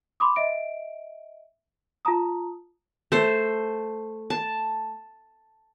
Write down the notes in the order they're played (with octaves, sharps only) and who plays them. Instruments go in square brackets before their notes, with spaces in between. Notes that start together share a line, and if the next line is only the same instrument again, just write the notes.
[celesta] B5 C6 D6 D#6
D#5 E5 D7
F4 A5 A#5 D#6
[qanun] A3 C5
A5